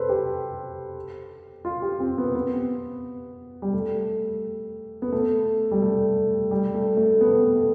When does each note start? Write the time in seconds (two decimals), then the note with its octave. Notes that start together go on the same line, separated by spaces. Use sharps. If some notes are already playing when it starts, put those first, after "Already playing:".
Already playing: A4 B4 C5
0.09 G4
1.65 F4
1.82 G4
2.00 C4
2.18 B3
2.35 B3
3.62 G3
3.73 A3
5.02 B3
5.12 A3
5.71 G3
5.82 A3
6.51 G3
6.74 A3
6.97 A3
7.21 B3
7.56 A3